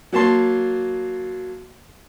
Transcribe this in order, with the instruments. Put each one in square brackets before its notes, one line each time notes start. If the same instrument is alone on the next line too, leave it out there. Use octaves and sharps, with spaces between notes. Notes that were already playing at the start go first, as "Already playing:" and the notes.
[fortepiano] F#3 A#3 A5 C6